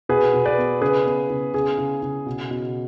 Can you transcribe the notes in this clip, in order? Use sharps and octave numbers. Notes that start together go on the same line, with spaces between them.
B2 G#4 B4
B2
B4 D5
B3
C#3 G#4 B4
B3
C#3
C#3 G#4
C#3
C#3
B2
B2